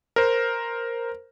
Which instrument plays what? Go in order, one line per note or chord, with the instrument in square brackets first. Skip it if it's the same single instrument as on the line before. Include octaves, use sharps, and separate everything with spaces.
[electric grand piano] A#4 C5